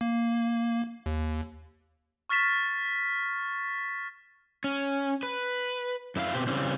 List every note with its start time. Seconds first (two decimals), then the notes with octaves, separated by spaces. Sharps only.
0.01 A#3
1.06 D#2
2.29 C#6 F6 A6 B6 E7
4.64 C#4
5.23 B4
6.16 F#2 E4 F4 F5
6.33 B2 C4 G4
6.47 C#3 E3 G3 C4